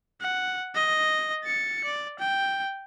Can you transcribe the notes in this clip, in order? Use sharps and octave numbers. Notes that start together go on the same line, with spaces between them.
F#5
D#5
A6 C#7
D5
G5